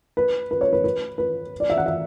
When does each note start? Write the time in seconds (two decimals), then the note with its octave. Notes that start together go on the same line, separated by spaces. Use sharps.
0.17 B4
0.51 B4
0.61 C#5
0.73 B4
0.84 B4
1.18 B4
1.60 D5
1.70 E5
1.78 F#5
1.86 E5